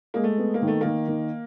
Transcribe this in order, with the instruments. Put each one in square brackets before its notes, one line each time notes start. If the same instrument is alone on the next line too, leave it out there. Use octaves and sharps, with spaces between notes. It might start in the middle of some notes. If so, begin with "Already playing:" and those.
[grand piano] G#3 [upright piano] A#3
[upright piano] A3
[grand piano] B3
[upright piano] A#3
[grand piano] D#3
[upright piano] A3
[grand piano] D#3 [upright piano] A#3
[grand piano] D#3